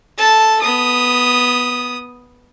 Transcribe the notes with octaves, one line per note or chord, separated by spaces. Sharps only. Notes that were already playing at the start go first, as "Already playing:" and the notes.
A4 A5
B3 D#6